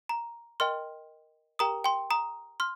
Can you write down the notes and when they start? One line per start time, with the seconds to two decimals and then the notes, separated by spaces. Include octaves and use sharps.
0.09 A#5
0.60 A#4 D#5 G5 C6 F6
1.59 G4 A#4 G5 A#5 D#6
1.84 G5 C6
2.10 A#5 D#6
2.60 C6 F6